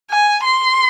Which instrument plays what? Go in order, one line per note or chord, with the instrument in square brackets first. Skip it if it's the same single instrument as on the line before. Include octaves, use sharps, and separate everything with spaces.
[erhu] G#5
C6